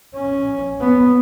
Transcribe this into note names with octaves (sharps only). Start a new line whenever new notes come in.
C#4
B3